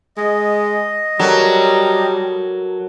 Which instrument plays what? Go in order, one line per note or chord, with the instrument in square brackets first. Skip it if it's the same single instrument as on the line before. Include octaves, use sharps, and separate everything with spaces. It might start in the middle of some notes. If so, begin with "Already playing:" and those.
[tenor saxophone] G#3 [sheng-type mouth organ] D#5
[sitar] F#3 [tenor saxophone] G3 [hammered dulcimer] A4 A#4